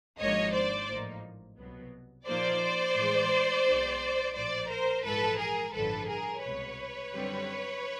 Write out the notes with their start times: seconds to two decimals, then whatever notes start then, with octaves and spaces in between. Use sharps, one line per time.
0.20 G#1 G#2 F3 A#3 D4 C#5 D#5
0.54 C5 D5
0.89 A1 A2 F3 A#3 D#4
1.58 C2 B2 F#3 B3
2.27 A#2 F3 A#3 D#4 C5 D5
2.97 A2 E3 G#3
3.65 B1 B2 G#3 C4 D#4
4.35 A#1 A2 F3 C5 D5
4.69 A#4 C5
5.04 A#1 G#2 E3 A4 B4
5.38 G#4 A#4
5.73 A1 G2 D3 F3 A4 B4
6.09 G#4 A#4
6.43 C2 B2 G#3 B4 C#5
7.12 F#2 D3 G3 C4